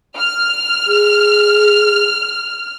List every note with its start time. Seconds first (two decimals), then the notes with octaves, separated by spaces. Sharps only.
0.17 F6
0.87 G#4